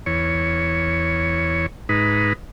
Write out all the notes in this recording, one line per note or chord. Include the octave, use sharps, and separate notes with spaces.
E2 C#5
G#2 D#4 B4